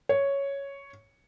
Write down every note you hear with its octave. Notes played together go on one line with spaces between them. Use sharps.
C#5